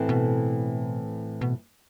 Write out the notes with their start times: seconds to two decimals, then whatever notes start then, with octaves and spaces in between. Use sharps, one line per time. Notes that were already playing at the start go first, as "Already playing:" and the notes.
Already playing: A2 E3 A3 C4
0.09 B2
1.41 B2